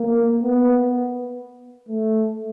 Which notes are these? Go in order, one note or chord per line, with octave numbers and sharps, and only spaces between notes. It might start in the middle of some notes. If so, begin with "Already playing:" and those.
Already playing: A#3
B3
A3